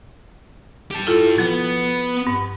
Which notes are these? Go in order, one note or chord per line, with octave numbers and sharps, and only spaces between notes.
G4 A5
E4 F4 A4
F3 B3
G2